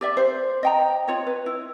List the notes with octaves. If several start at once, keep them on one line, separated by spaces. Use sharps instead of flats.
G4 D5 E5
C5
D#5 G5 A#5
F4 C#5 D#5
B4
E4